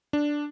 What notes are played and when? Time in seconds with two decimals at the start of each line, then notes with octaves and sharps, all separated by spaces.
0.13 D4